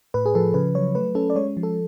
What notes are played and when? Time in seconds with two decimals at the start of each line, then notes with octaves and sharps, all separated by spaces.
0.14 A2 B4
0.26 G#4
0.35 F3 A4
0.54 C#3 B4
0.75 F#3 C#5
0.95 A3 B4
1.15 C#4 A4
1.30 D5
1.35 G#3 C#5
1.57 F3
1.63 A4